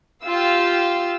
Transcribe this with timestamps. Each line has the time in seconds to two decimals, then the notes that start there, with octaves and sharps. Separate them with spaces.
0.24 F4 G4 F5 E6